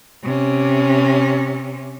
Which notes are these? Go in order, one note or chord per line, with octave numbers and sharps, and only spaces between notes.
C3 C#4